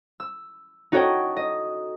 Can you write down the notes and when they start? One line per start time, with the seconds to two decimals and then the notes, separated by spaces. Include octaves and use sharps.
0.20 E6
0.92 D#4 F#4 A4 C#5 D#5 G5
1.37 D#5